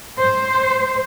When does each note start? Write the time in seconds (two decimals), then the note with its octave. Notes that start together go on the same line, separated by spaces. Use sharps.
0.18 C5